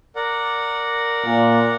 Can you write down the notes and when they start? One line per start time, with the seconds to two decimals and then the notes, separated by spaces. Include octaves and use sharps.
0.16 A#4 D5 F#5
1.25 A#2